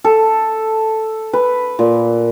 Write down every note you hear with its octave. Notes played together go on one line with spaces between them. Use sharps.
A4
B4
A#2